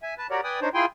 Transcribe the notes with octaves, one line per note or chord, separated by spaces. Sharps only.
E5 G#5
B4 A5
F#4 G4 A#4 C#5 D5
B4 D5 G5 G#5 D#6
D4 D#4 C5 C#5
E4 F4 G#4 G5 G#5 C6